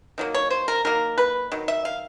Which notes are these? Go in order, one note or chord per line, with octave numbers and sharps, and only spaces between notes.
D#3 F#3 A#3
C#5
C5
A#4
D#3 F#3 A#3 A#4
B4
D#3 F#3
E5
F5